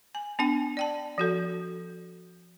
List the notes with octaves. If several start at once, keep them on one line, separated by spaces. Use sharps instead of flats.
G#5
B3 D4 G5
D5 G5 A5
F3 F#4 A4